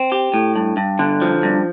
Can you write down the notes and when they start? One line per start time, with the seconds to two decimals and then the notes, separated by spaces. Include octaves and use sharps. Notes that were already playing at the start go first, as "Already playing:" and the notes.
Already playing: C4
0.12 G4
0.34 A2
0.56 G2
0.77 G2
0.99 D3
1.22 F3
1.43 G2